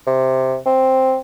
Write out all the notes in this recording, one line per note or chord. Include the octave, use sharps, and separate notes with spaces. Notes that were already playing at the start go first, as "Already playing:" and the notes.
C3
C4